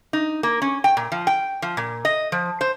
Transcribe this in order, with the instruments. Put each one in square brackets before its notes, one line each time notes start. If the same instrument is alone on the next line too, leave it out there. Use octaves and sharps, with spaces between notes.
[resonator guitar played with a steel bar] D#4
A#3
C#4
G5
A#2
F3
G5
F3
A#2
D#5
F3
C5